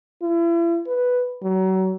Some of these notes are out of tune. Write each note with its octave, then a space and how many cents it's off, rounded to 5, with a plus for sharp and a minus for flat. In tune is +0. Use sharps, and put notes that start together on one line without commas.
E4 +40
B4 +0
F#3 +30